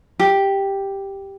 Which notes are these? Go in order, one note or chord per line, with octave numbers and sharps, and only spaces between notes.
G4